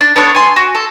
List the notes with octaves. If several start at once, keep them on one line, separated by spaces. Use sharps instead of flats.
D4
B3 D4 A4 C#5
G#5 C6
F#4
A4